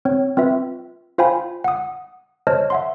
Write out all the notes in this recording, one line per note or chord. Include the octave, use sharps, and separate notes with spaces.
C4 C#5
C4 F4 B4 E5
F4 C5 F5 G5 G#5 B5
F#5 D#6
C5 C#5 D#5 A5 F6
E5 F#5 C6